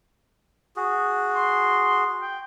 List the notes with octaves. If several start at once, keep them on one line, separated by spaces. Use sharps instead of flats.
F#4 G#4
C6
G5